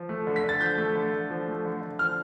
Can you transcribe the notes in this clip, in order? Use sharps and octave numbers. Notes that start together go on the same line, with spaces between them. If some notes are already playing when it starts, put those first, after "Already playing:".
Already playing: F3
A3
D3
B6
D3
A6
F3 G6
A3
D3
D3
F3
A3
D3
D3
F3 F6